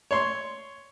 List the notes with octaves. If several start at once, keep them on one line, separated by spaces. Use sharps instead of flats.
C#5 C6